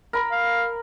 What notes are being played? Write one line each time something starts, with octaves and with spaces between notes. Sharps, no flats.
A#4 B5
F5